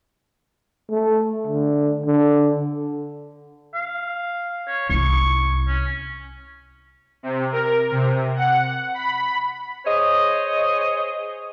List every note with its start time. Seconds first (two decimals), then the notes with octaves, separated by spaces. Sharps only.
0.91 A3
1.47 D3
2.06 D3
3.74 F5
4.68 C#5
4.90 C2 E4 C#6
5.67 C#4
7.23 C3
7.52 A#4
7.91 C3
8.36 F#5
8.94 B5
9.85 G#4 C5 C#5 D#5